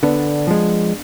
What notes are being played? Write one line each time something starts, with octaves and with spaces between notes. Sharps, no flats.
D3 B3 D4
F3 G#3